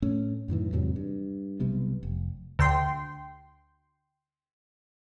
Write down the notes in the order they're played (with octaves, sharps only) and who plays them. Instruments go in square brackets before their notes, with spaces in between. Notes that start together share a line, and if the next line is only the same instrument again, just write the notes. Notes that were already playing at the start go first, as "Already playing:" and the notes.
[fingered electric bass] A2 A3 C#4
F#2 A2 D#3 E3
E2 G#2 C3 F#3
G2
B1 C3 G3 B3
F1
[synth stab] D2 G5 C6